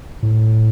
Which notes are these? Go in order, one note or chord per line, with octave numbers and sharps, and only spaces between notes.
A2